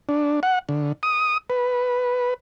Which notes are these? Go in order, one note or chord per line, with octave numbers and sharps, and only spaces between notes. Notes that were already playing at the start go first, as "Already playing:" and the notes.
D4
F#5
D3
D#6
B4